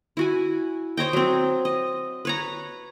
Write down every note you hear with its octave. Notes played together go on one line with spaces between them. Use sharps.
E4 F#4 G#5
C5 C#5 D#5 G5
F#3 C4
D#5
B4 C#5 A#5